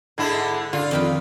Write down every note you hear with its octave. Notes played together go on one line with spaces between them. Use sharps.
G#2 D3 G#3 E4
D3 F4
F2 D#3 B5